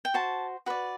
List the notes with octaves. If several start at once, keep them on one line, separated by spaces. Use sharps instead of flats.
G5
F#4 C5 A5
F#4 B4 D5